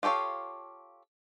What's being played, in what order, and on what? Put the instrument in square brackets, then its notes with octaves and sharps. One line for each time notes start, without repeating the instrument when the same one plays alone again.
[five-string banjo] F4 G4 A4 C#5 F5